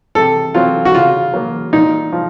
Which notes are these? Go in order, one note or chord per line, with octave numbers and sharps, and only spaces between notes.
C3 A4
F#3 C4 F4
F#4
C#3 F4
F#3 A#3
A#2 D#4
F3